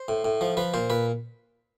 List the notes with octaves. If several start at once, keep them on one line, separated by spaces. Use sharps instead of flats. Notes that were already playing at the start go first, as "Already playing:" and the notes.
Already playing: C5
A2
A2
F3
F3 B4
A#2 C5
A#2 B4